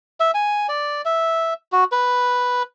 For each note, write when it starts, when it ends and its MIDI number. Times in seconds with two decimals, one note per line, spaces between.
0.20 0.31 76
0.34 0.67 80
0.69 1.02 74
1.05 1.54 76
1.72 1.84 66
1.92 2.63 71